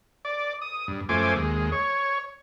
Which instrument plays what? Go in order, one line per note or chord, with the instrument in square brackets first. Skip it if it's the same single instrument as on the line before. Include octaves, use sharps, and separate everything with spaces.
[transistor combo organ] D5
D#6
G2
F#2 F3 A3 C5 G#5 D6
D#2 G#3
C#5